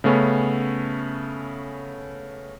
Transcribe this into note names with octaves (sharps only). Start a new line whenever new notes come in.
C#3 A3 B3 C#4